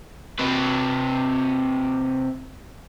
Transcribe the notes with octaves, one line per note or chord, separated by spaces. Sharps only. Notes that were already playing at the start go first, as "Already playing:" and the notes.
C3 B4